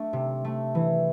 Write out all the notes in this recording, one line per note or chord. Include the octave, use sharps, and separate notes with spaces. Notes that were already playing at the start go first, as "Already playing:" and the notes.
Already playing: A3 D4
C3
A3
E3